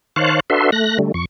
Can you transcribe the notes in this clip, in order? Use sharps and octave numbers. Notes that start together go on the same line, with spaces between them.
D#3 C5 C#5 F5 A5 F#6
D4 F#4 A4 B4 E5 C6
A3 F#6 A#6
D3 G3 A3
F2 C#6